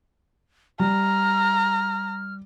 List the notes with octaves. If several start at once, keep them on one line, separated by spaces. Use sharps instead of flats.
G3 A#5 F6